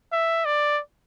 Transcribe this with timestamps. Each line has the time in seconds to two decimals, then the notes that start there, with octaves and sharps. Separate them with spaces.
0.12 E5
0.45 D5